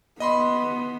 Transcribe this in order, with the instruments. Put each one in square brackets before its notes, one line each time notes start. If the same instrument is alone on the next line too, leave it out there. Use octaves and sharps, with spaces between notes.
[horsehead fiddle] B3 [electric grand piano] D#5 B5 C6